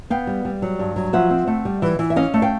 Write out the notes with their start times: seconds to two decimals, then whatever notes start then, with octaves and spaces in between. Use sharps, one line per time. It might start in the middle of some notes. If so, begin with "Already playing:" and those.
0.10 B3 F5 G5
0.27 G3
0.45 G3
0.62 F#3
0.79 G2
0.96 F#3
1.13 F3 E5 F#5
1.31 C4
1.47 A3
1.65 G3
1.82 E3
1.99 E3
2.10 E5
2.16 C#4 D#5 F5
2.34 A3
2.42 F5 G5